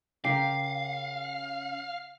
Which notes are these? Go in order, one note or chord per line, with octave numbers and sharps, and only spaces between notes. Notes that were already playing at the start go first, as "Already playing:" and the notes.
C#3 G4 A#4 F5 C7